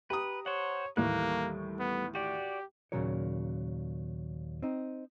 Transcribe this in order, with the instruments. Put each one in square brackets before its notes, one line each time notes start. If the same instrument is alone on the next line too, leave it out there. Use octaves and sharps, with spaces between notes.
[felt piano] G4 A#5 D#6 [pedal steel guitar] B4
[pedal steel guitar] C5 F#5 [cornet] C#5
[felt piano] D#2 A2 E3 [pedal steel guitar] G3 A4 F#6 [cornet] A#3
[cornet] B3
[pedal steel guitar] F#4 D5 [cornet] G4
[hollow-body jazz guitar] D#2 A#2 C#3 F#3 A#4 C#5
C4 D#4